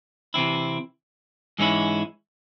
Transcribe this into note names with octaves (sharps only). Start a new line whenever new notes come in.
C3 E3 C4 E4
G#2 E3 G#3 C#4 E4